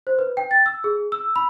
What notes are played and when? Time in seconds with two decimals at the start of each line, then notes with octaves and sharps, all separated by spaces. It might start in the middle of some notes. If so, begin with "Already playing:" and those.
0.07 C5
0.19 B4
0.37 G5
0.51 A6
0.66 E6
0.84 G#4
1.12 E6
1.36 B5